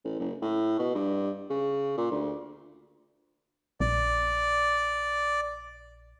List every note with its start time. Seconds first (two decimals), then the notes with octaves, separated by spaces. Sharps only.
0.05 A1
0.19 F#1
0.42 A2
0.79 B2
0.95 G2
1.50 C#3
1.97 A#2
2.11 D2
3.80 A#1 D5